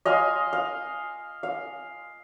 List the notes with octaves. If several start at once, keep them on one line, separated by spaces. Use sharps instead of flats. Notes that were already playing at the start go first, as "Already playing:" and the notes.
D#5 F5 G#5 C6
F5
F5